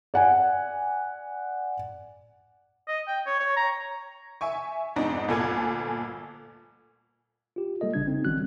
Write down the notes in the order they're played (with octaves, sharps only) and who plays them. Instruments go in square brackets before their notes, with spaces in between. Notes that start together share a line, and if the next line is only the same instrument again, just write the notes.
[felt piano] D5 F#5 G#5
[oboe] D#5
G5
C#5
C#5
A#5
[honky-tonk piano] E5 G#5 C#6
F2 G#2 B3 D4 D#4
G1 D2 A#2 A4 G#5 G#6
[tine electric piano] F4 G4
G3 A#3 A4 D#5
G#1 C#3 D4 G#6
C4 D#4
A1 D#3 G3 C#4 F#4 F#6